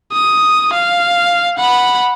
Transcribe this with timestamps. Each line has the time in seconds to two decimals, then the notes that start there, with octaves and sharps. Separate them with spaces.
0.13 D#6
0.73 F5
1.58 F#5 B5